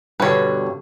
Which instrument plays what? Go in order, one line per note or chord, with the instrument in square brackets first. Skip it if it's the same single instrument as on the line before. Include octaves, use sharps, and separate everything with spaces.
[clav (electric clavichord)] G2 B2 D3 [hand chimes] B3 F#4 G4 [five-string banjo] B4 C#5